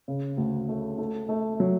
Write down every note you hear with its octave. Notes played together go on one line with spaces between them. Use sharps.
C#3
D2
A3
A3
A3
F#3